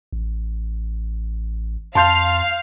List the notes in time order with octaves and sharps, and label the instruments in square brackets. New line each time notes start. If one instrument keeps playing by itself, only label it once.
[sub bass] A1
[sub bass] F2 [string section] F5 [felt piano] A5 C6 G6